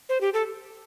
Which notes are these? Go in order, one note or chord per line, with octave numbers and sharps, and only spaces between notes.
C5
G4
A4